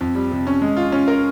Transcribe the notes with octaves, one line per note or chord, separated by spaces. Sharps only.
F2
G3
C3
C#4
G#3
F4
C#4
A#4